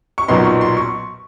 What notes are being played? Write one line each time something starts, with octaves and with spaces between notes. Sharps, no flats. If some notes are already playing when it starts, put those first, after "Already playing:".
C#6
B1 A#2 F#3 B3 D#4 C6
C#6
C6
C#6